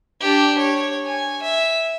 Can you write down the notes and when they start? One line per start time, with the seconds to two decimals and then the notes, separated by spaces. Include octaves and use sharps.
0.21 D4 G4
0.59 C#5
1.06 G#5
1.42 E5